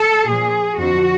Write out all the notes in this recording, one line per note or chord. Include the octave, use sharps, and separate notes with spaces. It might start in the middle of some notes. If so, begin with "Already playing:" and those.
Already playing: A4
A#2 F3 G#4
F2 D3 F3 F#4